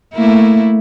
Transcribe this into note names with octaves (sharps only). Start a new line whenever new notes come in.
A3 A#3 E4